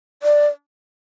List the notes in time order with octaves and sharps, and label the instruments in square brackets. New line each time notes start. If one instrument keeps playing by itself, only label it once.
[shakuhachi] D5